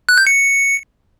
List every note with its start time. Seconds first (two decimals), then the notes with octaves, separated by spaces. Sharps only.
0.09 F#6
0.18 G6
0.27 C#7